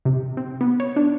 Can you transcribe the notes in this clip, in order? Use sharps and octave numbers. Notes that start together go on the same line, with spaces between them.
C3
C4
B3
C#5
D4